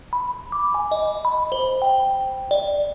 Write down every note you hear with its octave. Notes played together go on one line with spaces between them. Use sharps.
B5
D6
G#5
D#5
B5
C5
G5
D5